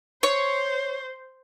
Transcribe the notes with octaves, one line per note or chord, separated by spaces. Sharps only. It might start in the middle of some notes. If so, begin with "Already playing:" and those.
C5 C#5